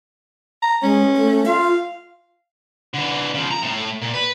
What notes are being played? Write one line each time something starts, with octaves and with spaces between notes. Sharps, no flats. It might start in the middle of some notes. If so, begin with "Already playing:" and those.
A#5
G#3 C#4
A3
F4 F5
D3 E3
C#3 F3
A#5
A2 A3
A#2
B4